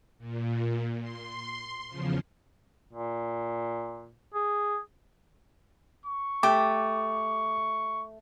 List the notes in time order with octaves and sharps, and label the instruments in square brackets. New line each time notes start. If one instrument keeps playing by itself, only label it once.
[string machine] A#2
C6
E2 C#3 F3
[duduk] A#2
G#4
[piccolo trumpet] C#6
[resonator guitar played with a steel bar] A3 [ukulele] G4 [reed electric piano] D6